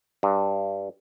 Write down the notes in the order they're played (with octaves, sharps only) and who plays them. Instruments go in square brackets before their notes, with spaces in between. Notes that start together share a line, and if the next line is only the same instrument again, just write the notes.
[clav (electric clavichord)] G2